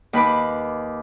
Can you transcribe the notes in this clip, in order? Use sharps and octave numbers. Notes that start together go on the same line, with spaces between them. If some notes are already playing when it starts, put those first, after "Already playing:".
D#2 B4 B5 D6